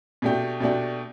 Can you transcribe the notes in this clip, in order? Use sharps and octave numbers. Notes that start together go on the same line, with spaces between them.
B2 A3 D4 G4
B2 A3 D4 G4